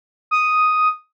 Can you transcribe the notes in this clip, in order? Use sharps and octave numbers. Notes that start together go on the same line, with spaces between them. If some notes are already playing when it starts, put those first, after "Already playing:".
D#6